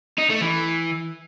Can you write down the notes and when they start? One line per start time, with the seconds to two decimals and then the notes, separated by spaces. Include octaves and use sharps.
0.18 D#4
0.30 A3
0.41 E3